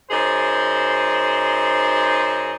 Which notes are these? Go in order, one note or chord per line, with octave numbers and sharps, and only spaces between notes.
F#2 D#4 G#4 C5